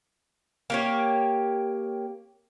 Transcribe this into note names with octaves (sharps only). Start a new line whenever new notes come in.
A#3 G4 C#5